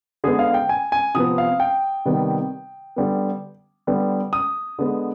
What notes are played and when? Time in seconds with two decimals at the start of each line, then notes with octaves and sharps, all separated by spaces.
0.24 D3 G#3 B3 G#4
0.39 F5
0.54 G5
0.69 G#5
0.92 G#5
1.14 C3 F3 B3 D#6
1.38 F5
1.60 G5
2.05 C3 D#3 G3 B3
2.96 D3 G3 B3
3.87 D3 G3 B3
4.33 D#6
4.79 D3 G#3 B3